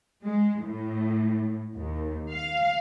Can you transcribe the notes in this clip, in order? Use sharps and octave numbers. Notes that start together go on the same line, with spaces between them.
G#3
A2
D#2
F5